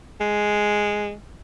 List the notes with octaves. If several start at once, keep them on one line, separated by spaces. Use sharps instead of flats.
G#3